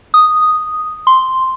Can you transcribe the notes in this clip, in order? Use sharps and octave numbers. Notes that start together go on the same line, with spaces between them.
D#6
C6